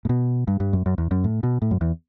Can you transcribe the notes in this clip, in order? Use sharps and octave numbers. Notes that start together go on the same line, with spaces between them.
A2
B2
G2
G2
F#2
F#2
E2
F#2
A2
B2
A2
F#2
E2